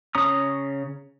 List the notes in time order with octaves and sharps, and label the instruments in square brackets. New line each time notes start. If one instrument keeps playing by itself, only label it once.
[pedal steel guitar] C#3 C#4 A#5 D#6